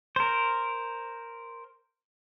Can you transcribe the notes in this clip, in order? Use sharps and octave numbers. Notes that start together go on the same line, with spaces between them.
A#4 C5